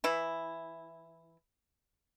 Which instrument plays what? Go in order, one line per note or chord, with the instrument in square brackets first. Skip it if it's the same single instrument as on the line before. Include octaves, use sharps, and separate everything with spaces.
[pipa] E3 E4